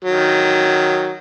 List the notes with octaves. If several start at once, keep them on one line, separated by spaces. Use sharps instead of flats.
D#3 F#3